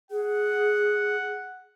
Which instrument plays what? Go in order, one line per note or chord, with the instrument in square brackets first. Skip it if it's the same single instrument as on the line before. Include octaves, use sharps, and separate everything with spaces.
[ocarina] G#4 [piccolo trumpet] F#5